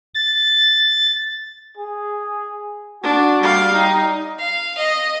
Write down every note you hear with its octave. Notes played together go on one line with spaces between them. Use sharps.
A6
G#4
D4 F#4
G3 F5
G3 D#4
F5
D#5